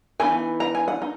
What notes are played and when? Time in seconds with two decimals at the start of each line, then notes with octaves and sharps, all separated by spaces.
0.20 E3 B3 D#4 G#5
0.60 A#5
0.75 G#5
0.88 F#5
1.02 D#4